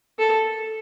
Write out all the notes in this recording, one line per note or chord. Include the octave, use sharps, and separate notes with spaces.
A4